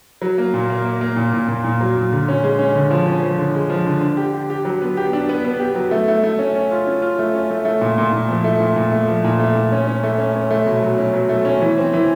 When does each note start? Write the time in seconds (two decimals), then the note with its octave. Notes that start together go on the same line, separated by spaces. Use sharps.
0.22 F#3
0.38 A#3
0.54 A#2
0.70 A#3
0.85 A#3
1.01 A#3
1.16 A#2
1.33 A#2
1.48 A#2
1.64 A#2
1.81 F#3
1.97 A#2
2.13 D3
2.28 C#4
2.43 G#3
2.59 C#4
2.75 D3
2.91 F3
3.07 C#4
3.23 F3
3.38 D3
3.55 G#3
3.70 F3
3.86 D3
4.02 D4
4.17 G4
4.34 G4
4.50 G4
4.65 F#3
4.82 B3
4.97 G4
5.13 D4
5.29 B3
5.45 B3
5.59 G4
5.75 F#3
5.91 A3
6.08 A3
6.23 A3
6.39 C#4
6.55 C#4
6.71 F4
6.87 C#4
7.02 F4
7.19 A3
7.34 C#4
7.51 A3
7.65 A3
7.81 A#2
7.98 A#2
8.13 A#2
8.29 F3
8.44 A3
8.60 A#2
8.76 A#2
8.92 A3
9.08 F3
9.24 A#2
9.39 A3
9.55 A#2
9.72 C#4
9.87 C#4
10.03 A3
10.18 C#4
10.35 C#4
10.51 A3
10.66 B2
10.82 F#3
10.98 C#4
11.14 F#3
11.29 A3
11.45 C#4
11.62 E3
11.78 C4
11.94 E3